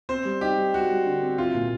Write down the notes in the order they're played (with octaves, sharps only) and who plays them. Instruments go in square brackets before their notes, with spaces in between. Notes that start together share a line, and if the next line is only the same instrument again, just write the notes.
[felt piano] C4 [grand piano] C5
[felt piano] G3
[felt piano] D#4 [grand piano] G4
[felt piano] G3
[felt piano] G3 [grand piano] F#4
[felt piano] G3
D3
C4
[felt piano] C2 [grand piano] F4
[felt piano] A#2